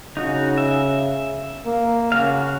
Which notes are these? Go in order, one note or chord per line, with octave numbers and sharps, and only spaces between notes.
C#3 D#4 F#4
E5
A#3
C#3 F#4 F5